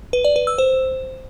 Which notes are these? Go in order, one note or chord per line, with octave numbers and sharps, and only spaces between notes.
B4
D5
B4
E6
C5